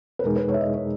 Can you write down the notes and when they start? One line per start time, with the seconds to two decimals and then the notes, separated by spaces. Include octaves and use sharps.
0.19 B4
0.23 E2 B2 G#3 D#4 G#4 A#4
0.36 B4
0.49 C#5
0.54 E5
0.61 D#5
0.74 C#5